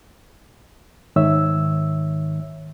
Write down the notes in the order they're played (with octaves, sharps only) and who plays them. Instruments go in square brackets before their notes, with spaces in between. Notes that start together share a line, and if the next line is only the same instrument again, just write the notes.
[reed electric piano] G#2 D#3 C#5 E5 E6